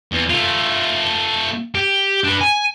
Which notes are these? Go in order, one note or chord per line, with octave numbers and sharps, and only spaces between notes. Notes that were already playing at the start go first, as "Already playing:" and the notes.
E2
A3 F4
G4
D4 B4
G#5